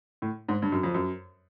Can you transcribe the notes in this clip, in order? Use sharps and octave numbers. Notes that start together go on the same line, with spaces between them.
A2
G#2
G2
F#2
F2
F#2